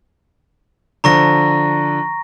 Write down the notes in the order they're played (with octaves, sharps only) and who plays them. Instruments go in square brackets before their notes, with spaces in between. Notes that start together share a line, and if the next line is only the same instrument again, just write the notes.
[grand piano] D3 F3 [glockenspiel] A#5 C#6 A#6